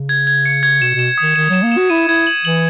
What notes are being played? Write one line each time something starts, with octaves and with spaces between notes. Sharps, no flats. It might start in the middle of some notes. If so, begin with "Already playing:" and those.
Already playing: C#3
G#6
G#6
C#7
G#6
B2 E7
B2 E7
D#3 D#6
D#3 E7
F#3 E7
A#3
E7
F#4
E4 D#7
E4 G#6
F#7
E3 F#7